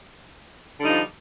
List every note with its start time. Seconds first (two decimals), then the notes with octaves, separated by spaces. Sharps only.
0.79 D3
0.82 G3
0.85 D#4
0.88 F3